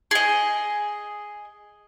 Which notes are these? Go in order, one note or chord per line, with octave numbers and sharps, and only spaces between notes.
G#4 D#5